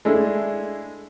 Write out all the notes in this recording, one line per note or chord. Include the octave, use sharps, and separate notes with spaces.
G#3 A3 D4 E4 A4